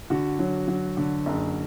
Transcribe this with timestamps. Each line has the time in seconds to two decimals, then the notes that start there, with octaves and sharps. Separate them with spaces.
0.10 D3 F#4
0.39 F#3
0.68 F#3
0.97 D3
1.26 F#1